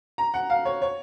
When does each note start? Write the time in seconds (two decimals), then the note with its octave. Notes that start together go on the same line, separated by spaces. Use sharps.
0.18 A#5
0.34 F#5
0.50 F5
0.65 C#5
0.82 C#5